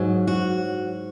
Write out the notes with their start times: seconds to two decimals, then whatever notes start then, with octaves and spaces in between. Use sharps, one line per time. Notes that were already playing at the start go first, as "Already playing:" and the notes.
Already playing: G#2 F#3
0.27 F#4